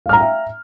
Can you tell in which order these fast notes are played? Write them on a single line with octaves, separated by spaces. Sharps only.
F5 F6 A#5 G5 E5